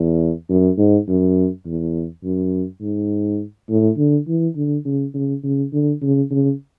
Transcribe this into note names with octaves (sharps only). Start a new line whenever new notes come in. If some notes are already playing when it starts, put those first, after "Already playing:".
Already playing: E2
F#2
G#2
F#2
E2
F#2
G#2
A2
D3
E3
D3
C#3
C#3
C#3
D3
C#3
C#3